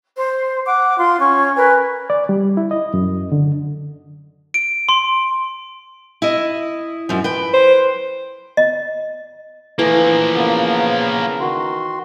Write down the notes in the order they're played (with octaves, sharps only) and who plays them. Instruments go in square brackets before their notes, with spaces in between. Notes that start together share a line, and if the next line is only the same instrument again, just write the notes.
[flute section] C5
F#5 D6
F4 C6
C#4 C#6
A#4 B4 G#5
[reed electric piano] D5
G3
E4
D#5
F#2
D3
[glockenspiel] D7
C6
[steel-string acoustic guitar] E4 D#5
F#2 F3
B4 G5
[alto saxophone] C5
[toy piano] D#5
[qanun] E3 A3 [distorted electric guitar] F3 A#3
[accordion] C#3 B3 A#4
D#3 F#4 C6